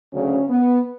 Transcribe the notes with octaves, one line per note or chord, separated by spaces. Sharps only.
D2 C#3 F#3 C#4
B3